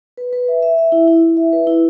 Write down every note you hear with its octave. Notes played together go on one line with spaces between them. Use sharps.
B4
B4
E5
E5
E5
E4
E4
E4
E5
B4
E4